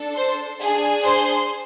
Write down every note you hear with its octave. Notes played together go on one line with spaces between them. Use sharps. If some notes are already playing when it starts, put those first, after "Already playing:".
Already playing: D4 A4
C5 C6
D4 G#4
C5 C6